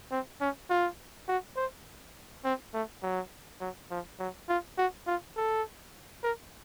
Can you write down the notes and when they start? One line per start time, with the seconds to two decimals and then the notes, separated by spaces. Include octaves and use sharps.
0.11 C4
0.40 C#4
0.70 F4
1.28 F#4
1.57 C5
2.45 C4
2.73 A3
3.03 F#3
3.61 F#3
3.91 F3
4.19 F#3
4.49 F4
4.77 F#4
5.06 F4
5.36 A4
6.23 A#4